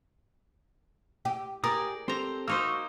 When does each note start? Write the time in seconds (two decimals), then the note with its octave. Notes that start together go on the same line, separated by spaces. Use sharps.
1.25 G4
1.64 G4 G#4 A#4 D5 D#6
2.08 C4 G4 A4 C5 A#5
2.48 A#3 D#4 F#4 C5 C#6 E6